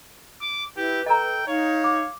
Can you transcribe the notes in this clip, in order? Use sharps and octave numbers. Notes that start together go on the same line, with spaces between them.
D6
E4 G4 B4
A4 D#5 G5 A#5
D#4 C#5 F5
D6